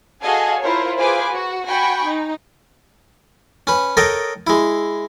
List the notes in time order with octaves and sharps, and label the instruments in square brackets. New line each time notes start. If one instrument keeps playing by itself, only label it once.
[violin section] F#4 G#4 A4 D#5 F5 G#5
E4 F4 A#4 C5 C#5
F4 G#4 B4 C5 G#5 D6
F#4
F#4 G5 G#5 B5 C#6
D#4
[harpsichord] C#4 B4
A4 A#4 C#5 D#5 G5
G#3 E4